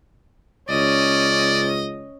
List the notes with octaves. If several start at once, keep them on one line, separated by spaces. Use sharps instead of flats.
C#2 C#4 D5 D#5